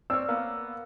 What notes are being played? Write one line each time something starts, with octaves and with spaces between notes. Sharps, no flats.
C4 C#5 D5 E6 F6
A#3 B3 F5